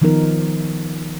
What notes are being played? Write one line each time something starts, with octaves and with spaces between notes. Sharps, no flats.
D#3 F3 B3 D#4 A#4